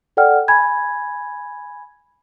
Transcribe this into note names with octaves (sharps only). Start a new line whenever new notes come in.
A4 D5 F#5 G5 F6
G#5 B5 G#6